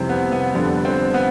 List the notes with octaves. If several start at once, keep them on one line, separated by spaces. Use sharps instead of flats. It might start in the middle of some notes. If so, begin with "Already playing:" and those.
Already playing: F2 C3 E3 G3 C4
B3
B3
F2 D3 G3 B3
C4
B3